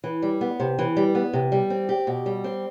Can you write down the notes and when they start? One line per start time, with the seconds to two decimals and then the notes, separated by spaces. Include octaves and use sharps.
0.04 E3
0.22 G3
0.41 B3
0.60 C3
0.79 E3
0.97 G3
1.15 B3
1.33 C3
1.52 G3
1.70 C4
1.89 G4
2.07 B2
2.26 G3
2.44 C4